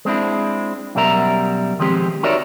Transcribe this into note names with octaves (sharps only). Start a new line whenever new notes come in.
G#3 C4 D4 E4
F#2 B2 G3 A#4 E5 A#5
D#3 F3 G#3 C4 G4
D#4 F#4 A#4 C#5 D5 E5